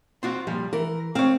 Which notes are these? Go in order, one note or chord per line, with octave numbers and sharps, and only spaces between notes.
C4 F4 F#4
A#2 F3 G3
E3 A#4
C4 C#5 F5